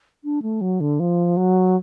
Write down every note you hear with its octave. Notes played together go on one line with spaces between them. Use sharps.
D4
A3
F#3
D3
F3
F#3